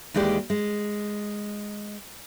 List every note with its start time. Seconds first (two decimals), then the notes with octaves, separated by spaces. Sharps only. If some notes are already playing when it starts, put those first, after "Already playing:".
0.14 D#2 E3 G#3 G4 D5
0.50 G#3